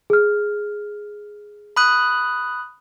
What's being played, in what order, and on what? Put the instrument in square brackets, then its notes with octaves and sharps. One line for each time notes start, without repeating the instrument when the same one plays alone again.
[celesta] G#4 F6
[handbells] B5 D#6 F#6